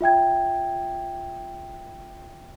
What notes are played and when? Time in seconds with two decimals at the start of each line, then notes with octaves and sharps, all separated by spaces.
0.01 F4 E5 G5 G#6